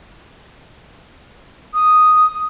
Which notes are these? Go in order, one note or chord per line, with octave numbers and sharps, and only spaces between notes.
D#6